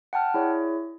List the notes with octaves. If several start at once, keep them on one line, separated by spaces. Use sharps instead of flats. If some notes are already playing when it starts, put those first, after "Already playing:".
F#5 G5 A5 F6
E4 G#4 C#5 D5